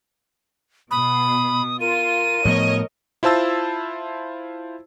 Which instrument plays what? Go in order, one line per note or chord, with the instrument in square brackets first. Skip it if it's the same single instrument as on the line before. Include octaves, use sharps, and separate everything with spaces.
[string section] B2 [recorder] B5 [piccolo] D#6
[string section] F4 [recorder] A#4 [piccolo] D#7
[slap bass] A2 F3 B3 [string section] C#5 D#5
[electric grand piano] E4 F4 C5 A5 E6 A6